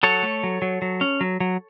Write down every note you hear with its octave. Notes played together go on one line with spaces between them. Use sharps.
F#3 A4 C#5
A3
F#3
F#3
F#3
C#4
F#3
F#3